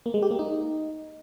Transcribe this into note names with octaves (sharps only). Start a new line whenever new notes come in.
A#3
G#3
G4
A#3
D#4